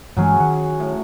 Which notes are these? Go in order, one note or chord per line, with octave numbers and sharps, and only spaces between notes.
G2 E3 F#3 G#3 C#4 G#4
D#3 F#5
A2